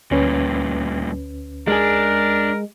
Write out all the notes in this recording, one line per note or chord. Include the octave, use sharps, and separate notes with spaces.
D2 G2 A#2 C#4 B4
G#3 D4 G#4 A#4